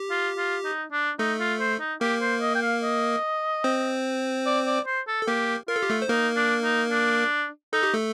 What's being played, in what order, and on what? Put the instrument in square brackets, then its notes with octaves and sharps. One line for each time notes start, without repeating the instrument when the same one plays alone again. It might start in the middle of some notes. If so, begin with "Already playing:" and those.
Already playing: [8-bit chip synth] G4
[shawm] F4
F4
D#4
D4
[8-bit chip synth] A3 A4 [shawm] D#4
[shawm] F4
C5
D#4
[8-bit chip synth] A#3 A#4 [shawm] G4
[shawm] C5
D#5
G5
F5
D#5
[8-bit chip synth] C4 C5
[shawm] D5
D5
C5
A4
[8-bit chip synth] A4
[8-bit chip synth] A#3 A#4 [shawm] G4
[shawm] F4 [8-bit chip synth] A#4
[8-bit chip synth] A4
G4
A3 A4
C5
[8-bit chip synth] A#3 A#4 [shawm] D#4
[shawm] D4
D#4
D4
[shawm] D#4 [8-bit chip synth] A4
[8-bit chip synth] G4
A3 A4